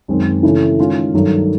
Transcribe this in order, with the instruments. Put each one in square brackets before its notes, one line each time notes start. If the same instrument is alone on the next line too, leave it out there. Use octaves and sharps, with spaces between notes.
[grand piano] F#2 D#3 G#3 C4
C#3 E3 A3 C#4 E4
D#3 G#3 C#4 F4
G2 D#3 F#3 A3 D4